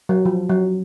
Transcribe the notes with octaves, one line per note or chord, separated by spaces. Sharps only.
F#3
F3
F#3